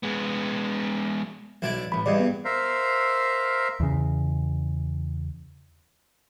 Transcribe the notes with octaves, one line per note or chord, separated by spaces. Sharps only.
G#3 B3
B1 E4 D5
A1 B5
E2 G2 D5 D#5
B3
A#4 C5 E5 F5
E2 C#3